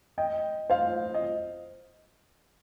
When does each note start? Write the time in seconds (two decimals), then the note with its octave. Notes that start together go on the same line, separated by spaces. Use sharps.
0.18 D#5 G5
0.70 C5 F5
1.14 D#5